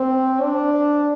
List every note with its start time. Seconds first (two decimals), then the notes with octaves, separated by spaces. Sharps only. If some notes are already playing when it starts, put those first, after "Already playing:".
Already playing: C4
0.42 D4